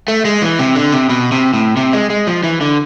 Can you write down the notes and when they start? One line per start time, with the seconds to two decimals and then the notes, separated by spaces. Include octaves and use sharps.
0.08 A3
0.25 G#3
0.42 E3
0.59 C3
0.76 D3
0.92 C3
1.09 B2
1.32 C3
1.54 A2
1.77 C3
1.93 G#3
2.10 G#3
2.27 F3
2.43 E3
2.61 D3